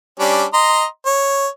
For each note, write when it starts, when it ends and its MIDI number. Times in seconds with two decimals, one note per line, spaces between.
0.20 0.45 55
0.20 0.45 61
0.20 0.45 62
0.54 0.85 75
0.54 0.85 82
0.54 0.85 84
1.06 1.48 73